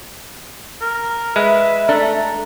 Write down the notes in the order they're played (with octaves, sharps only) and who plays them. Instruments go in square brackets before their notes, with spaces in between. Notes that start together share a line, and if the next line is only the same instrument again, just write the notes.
[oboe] A#4
[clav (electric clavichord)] G#3 [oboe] B4 [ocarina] E5
[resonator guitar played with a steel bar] A3 D4 A4 [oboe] A#5